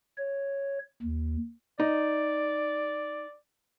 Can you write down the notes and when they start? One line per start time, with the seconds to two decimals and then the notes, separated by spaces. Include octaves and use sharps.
0.18 C#5
1.02 D#2
1.80 D#4 D5